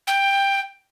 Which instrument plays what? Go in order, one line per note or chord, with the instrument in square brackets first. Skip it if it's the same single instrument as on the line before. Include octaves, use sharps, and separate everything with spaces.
[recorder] G5